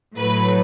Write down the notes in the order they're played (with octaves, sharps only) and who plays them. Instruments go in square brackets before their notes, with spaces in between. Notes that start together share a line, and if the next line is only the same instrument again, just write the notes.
[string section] A2 F#3 A3 B4